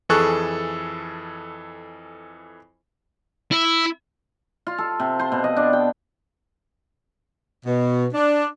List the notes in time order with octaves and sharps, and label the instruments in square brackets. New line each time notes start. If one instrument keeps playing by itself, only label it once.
[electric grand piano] F2 E3 G#4 A4 C#6 F#6
[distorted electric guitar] E4
[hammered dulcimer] F4
A4
C3
C5
B2
D#5
D4
G5
[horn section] B2
D4